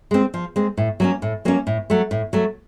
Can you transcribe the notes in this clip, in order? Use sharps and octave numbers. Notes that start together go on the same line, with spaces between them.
G#3 C4
F3
G#3 C4
A2
F#3 A#3 C#4
A2
F#3 A#3 C#4
A2
F#3 A3
A2
F#3 A3